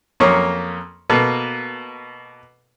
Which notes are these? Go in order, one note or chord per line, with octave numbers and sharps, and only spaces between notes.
F2 F#3 A#3 C#4 C#6
B2 A#3 A4 B4